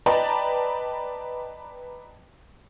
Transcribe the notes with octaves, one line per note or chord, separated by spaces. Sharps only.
B4 D5 D#5 G5 A5 A#5